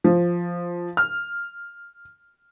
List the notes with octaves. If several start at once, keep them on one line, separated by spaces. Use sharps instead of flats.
F3
F6